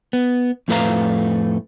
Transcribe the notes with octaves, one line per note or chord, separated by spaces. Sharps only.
B3
F2 A2 A3 B4 F5 A#5